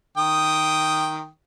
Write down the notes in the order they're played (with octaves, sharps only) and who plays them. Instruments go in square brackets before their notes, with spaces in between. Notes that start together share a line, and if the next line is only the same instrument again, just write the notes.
[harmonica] D#3 G5 D#6